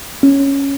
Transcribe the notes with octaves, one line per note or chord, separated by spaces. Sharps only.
C#4